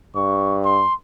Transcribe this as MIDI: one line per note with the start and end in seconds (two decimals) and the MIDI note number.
0.15 0.84 43
0.15 0.57 85
0.65 0.94 84